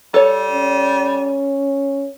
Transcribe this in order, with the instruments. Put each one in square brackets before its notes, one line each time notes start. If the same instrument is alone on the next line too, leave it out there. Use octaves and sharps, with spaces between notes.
[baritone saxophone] G3 [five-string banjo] A4 C#5
[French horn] C#4